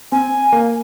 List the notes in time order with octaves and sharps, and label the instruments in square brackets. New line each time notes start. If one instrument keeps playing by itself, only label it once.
[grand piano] C4 [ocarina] G#5
[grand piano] A#3